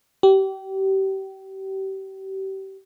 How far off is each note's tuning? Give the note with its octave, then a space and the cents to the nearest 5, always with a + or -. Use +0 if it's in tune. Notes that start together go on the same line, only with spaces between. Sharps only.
G4 -30